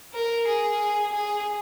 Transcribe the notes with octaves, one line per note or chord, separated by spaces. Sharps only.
A#4
G#4
G#4